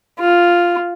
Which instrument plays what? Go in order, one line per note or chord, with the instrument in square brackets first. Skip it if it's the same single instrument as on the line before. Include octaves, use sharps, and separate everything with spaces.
[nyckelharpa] F4